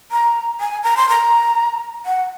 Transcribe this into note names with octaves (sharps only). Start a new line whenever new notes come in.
A#5
G#5
A#5
C6
A#5
F#5